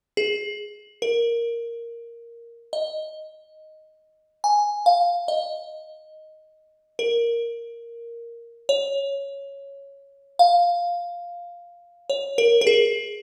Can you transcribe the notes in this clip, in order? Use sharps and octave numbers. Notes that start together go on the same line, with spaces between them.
G#4
A#4
D#5
G#5
F5
D#5
A#4
C#5
F5
C#5
A#4
A#4
G#4